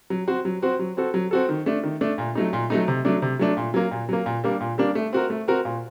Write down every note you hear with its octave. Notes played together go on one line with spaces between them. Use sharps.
F#3
C4 F#4 C5
F#3
C4 F#4 C5
F#3
C4 F#4 A4
F#3
C4 F#4 A4
D#3
A3 D4
D#3
A3 D4
A#2
F#3 A3 D#4
A#2
F#3 A3 D#4
C3
F#3 A3 D4
C3
F#3 A3 D4
A#2
F#3 A#3
A#2
F#3 A#3
A#2
G3 A#3 D4
A#2
G3 A#3 D4
A3
C4 F#4 A#4
A3
C4 F#4 A#4
A#2